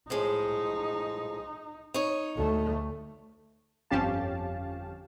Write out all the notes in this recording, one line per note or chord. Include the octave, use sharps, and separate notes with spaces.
A2 F3 G#3 D#4
D#4 C#5
D2 A3
G1 F2 C#4 G4 F5 A5